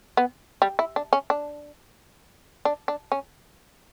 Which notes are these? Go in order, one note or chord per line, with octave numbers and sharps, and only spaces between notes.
B3
G3
E4
D4
C#4
D4
D4
D4
C#4